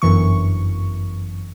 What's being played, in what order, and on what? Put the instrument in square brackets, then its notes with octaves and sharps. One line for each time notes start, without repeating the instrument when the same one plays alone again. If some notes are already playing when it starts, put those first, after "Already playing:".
[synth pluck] G1 F#2 E3 C#6